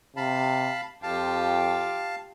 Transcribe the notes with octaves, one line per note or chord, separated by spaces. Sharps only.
C3 F5 A5 B5
F2 F4 G4 F5 A5